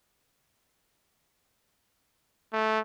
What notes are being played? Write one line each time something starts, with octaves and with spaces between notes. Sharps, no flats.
A3